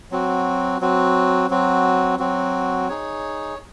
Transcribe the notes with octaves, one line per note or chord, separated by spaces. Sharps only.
F#3 C4 F#4
F#3 C4 F#4
F#3 C4 F#4
F#3 C4 F#4
D#4 G#4 C#5